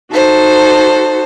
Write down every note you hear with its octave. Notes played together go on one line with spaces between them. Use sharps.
D#4 F#4 A4 C5